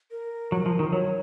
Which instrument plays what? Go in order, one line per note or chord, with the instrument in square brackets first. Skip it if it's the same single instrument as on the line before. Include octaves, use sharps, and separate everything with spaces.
[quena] A#4
[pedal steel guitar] F#3
F3
D#3
[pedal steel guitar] F#3 [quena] C#5